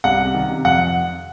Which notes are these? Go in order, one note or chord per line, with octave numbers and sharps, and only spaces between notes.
C2 F#5
C3
D#3
C3
F2 F#5